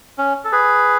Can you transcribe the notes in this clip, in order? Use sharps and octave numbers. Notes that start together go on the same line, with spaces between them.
C#4
A4
G#4 B4